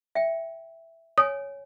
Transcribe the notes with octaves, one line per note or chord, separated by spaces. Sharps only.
E5 G5
C#5 G#5 D#6